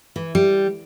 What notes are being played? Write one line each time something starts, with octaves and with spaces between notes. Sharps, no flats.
E3
G3